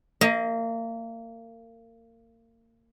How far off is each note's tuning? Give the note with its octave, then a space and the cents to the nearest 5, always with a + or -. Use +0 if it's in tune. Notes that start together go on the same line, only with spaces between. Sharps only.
A#3 -30 D#5 +20